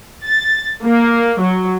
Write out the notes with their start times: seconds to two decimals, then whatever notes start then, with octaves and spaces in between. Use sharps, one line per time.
0.24 A6
0.84 A#3
1.41 F#3